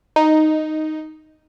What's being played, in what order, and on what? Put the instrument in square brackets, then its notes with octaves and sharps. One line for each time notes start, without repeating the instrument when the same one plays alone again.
[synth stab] D#4